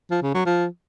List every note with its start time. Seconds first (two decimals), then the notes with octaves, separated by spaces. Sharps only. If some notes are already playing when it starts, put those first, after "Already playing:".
0.11 F3
0.23 C#3
0.34 F#3
0.46 F3